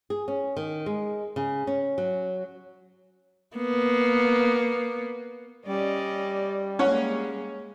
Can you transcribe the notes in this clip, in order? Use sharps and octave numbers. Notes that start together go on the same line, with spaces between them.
G#4
C#4
D#3
G#3
C#3
C#4
F#3
A#3 B3
G3 C#4 D5 D#5
G#3 A#3 C#4 C#5 F#5